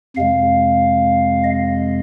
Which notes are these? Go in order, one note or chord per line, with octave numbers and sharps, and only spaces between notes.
F2 C3 G#3 F5
D#5